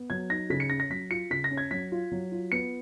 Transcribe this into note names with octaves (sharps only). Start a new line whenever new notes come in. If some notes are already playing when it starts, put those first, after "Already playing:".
Already playing: B3
F#3 G#6
D#4 A#6
C#3 B6
C#7
C#4 A#6
A#6
F#3 B6
F4 C#7
C#3 B6
A#6
C#4
G#6
F#3 B6
F4
F#3
F4
B3 C#7